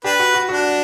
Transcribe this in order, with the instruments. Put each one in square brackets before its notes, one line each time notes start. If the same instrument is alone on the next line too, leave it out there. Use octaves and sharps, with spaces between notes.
[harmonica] D4 B4 [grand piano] G4
[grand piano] F#4
F#4
[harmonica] D4 [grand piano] F#4